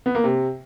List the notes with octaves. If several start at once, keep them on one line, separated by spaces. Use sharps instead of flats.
B3
A#3
C3